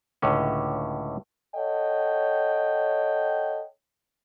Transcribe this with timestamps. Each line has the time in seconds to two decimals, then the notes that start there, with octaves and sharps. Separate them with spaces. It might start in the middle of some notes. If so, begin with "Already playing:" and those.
0.22 C#2 A2 D3 C#4
1.55 A4 C#5 D#5 F#5 G5